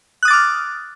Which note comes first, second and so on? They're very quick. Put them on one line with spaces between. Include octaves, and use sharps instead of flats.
F#6 D#6 A6 D6 F6